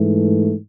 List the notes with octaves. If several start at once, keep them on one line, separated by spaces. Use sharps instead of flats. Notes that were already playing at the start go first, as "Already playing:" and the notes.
Already playing: G#2 E3 A3